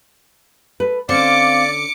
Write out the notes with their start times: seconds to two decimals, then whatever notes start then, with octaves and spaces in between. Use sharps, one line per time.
0.80 A4 B4
1.09 D3 C4 C#4 D5 F5 D6 C#7